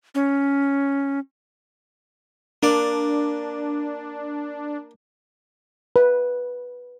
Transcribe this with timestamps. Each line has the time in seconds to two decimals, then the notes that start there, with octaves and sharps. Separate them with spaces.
0.15 C#4
2.63 A#3 D4 D5
5.96 B4